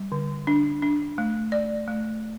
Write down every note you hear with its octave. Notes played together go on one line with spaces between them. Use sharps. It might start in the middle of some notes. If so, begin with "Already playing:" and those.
Already playing: G3
D3
D4
D4
A3
D5
A3